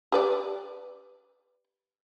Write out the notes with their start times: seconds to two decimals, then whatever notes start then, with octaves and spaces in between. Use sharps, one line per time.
0.12 G4 B4 D5